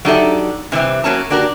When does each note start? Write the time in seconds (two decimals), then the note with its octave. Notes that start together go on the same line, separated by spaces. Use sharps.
0.05 F#3 D4 D#4 G4 A4 E5
0.72 C3 E3 G3 C4
1.04 F#3 A#3 C#4 A5
1.30 A#3 D4 F#4 G4 A#4